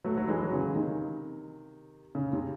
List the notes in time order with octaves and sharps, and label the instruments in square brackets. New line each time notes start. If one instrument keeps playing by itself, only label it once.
[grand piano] F#3 A3
F#3
E3 G#3
F#3
C#3 E3
C3 D#3
C#3
C3